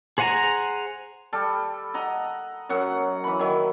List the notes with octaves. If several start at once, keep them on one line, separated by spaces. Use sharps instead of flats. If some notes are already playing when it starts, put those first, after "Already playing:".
G#4 C5 F#5 G#5 A#5
G3 A4
D#5 F#5 A#5
F#2 F#3 F#5
E3 B5
D#3 F#3